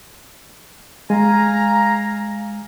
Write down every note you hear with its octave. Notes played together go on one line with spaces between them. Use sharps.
G#3 F5 G#5 A#5